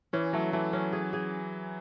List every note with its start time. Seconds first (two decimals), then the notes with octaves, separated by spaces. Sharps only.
0.13 E3 C#4
0.33 F#3 A3
0.53 E3 A3
0.73 F#3 C#4
0.92 G#4
1.13 G#4